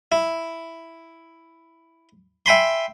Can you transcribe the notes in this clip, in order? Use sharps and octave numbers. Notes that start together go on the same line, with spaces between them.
E4
E5 G5 G#5 B5 C6